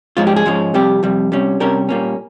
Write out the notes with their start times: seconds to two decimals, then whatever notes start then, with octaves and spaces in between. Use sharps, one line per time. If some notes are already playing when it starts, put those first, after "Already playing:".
0.17 G#2 F3 G#3 C#4 F4
0.27 G4
0.36 G#4
0.46 G#2 F3 G#3 C#4
0.74 F2 C3 G3 G4
1.03 F2 C3 G3
1.32 C3 G3 C#4
1.60 C3 G3 C#4 A#4
1.89 A#2 G3 A#3 C#4